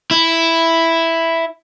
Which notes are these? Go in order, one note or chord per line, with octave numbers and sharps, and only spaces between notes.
E4